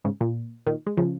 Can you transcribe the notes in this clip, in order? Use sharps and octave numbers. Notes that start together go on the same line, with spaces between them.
G#2 C#3
A#2
A#2 D#3
G#3
C#3 F3